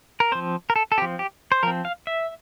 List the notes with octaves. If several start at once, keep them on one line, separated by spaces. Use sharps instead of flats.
A#4
F3 C4 C5
A#4
A4
A4
F3 C4 G4
G4
C5
F3 C4 A#4
F5
E5